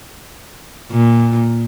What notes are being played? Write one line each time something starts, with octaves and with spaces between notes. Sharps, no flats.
A#2